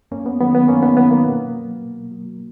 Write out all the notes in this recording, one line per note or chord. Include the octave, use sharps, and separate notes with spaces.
F#2 A#3 C#4
B3
D#3 F#3 B3
B3
F#2 A#3 C#4
B3 D#4
D#3 F#3 B3
A#3
B2
F#3
B2
F#3